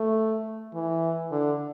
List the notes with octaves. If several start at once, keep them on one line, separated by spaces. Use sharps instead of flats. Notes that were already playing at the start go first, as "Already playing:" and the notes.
Already playing: A3
E3
D3